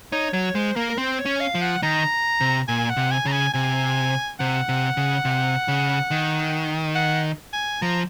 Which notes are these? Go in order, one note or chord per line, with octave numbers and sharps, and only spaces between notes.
D#4 C#5
F#3 C#5
G#3 C5
A#3 A#4
A#4
C4 C5
C#5
C#4
F5
F3
F#5
D#3 A#5
C3
A#2 G#5
F#5
C3
G#5
C#3 A#5
G#5
C3 G#5
C3 F#5
C3
C#3
C3
C#3
D#3
F#5
G#5
F3 A#5